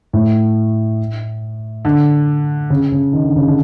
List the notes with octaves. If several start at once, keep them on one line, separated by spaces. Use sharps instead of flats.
A2
D3
C#3
C#3
D#3
D3
C#3
D3